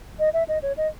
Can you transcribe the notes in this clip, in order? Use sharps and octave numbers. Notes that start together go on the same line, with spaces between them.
D#5
E5
D#5
C#5
D#5